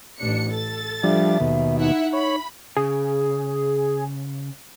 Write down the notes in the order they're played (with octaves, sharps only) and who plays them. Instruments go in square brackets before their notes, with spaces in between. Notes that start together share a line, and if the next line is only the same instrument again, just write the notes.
[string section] A1 D4 C#7
A4 A6
[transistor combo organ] F3 G3 D4 [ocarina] E5
[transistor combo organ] D#2 B2
[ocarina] D#4 [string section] E4 E5 F#5
[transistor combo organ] C#5 [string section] B5
[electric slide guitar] C#3 [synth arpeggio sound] G#4